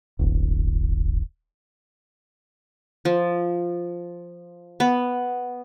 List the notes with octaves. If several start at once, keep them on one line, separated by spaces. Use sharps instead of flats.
D1 G1
F3
B3